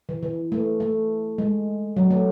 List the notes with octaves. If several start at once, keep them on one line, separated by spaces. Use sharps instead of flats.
E3
E3
A3
A3
G#3
F#3
A3